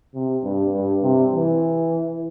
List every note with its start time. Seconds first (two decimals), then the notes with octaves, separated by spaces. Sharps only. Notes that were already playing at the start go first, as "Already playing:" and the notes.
0.14 C3
0.44 G2
0.73 G2
1.02 C3
1.32 E3